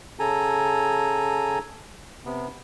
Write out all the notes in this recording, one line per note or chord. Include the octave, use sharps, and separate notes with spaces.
C#3 A4 G#5 A#5
C3 B3